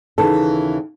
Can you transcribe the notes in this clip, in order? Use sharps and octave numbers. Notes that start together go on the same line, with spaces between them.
D#2 C#3 E3 A4